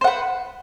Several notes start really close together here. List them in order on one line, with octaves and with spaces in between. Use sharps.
C5 F#5 B4